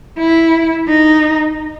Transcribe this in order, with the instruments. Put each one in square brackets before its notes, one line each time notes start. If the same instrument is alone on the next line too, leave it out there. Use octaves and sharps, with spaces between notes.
[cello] E4
D#4